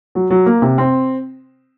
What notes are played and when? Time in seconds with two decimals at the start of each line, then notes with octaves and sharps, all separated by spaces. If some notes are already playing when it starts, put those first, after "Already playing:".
0.15 F#3
0.30 F#3
0.46 A#3
0.62 C3
0.78 C4